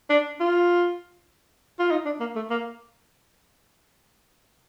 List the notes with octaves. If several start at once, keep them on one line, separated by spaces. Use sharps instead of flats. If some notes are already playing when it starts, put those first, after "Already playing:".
D4
F4
F4
D#4
D4
A#3
A3
A#3